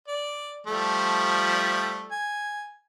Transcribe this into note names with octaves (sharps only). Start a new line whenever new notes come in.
D5
F3 G3 A3
G#5